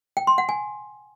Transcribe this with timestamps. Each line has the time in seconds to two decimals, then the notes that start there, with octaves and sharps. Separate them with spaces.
0.17 G5
0.27 C6
0.38 F#5
0.49 G#5